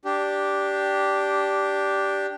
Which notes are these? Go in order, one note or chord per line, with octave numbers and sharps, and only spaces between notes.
D4 G4